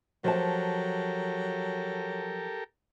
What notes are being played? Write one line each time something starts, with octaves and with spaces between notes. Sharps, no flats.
F3 F#3 G4 A4 A#4 A5